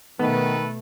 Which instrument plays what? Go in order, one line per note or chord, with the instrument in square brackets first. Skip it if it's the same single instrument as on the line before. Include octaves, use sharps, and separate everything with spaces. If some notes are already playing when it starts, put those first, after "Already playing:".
[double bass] B2 A3 [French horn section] D#3 [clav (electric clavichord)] B3 [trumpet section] A4 B4